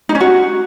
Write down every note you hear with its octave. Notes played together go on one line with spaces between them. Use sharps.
D#4
C#4
F#4